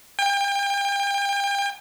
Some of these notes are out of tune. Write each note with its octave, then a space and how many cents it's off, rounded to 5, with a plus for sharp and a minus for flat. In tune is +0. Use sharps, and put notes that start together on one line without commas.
G5 +35